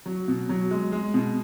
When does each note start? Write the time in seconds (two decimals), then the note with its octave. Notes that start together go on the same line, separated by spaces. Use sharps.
0.06 F#3
0.28 B2
0.49 F#3
0.71 G#3
0.92 G#3
1.14 B2